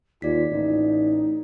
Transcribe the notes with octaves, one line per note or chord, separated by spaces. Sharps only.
D#2 F4 D5 B6
A1 D#4